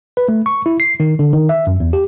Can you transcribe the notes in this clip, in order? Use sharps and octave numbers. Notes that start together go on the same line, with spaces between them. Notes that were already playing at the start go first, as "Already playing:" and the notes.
B4
A3
C#6
E4
C7
D#3
D3
D#3
E5
F#2
E2
G4